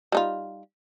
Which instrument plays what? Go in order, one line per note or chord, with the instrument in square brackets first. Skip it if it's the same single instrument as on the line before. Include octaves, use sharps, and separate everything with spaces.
[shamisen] G3 D#4 F4